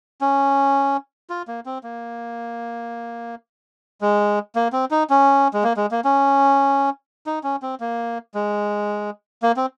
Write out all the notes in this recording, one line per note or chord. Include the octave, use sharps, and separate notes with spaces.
C#4
F4
A#3
C4
A#3
G#3
A#3
C4
D#4
C#4
G#3
A#3
G#3
A#3
C#4
D#4
C#4
C4
A#3
G#3
A#3
C4